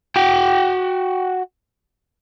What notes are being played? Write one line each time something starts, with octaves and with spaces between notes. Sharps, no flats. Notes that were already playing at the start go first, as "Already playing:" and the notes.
F#4 G5